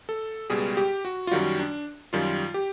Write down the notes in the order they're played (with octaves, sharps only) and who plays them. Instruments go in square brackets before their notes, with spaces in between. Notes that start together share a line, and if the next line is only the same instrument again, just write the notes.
[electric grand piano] A4
C#2 B2 G3 G#4
G4
F#4
F4
F#2 D#3 G3 F#4
D4
F#2 D#3 G3 F4
G4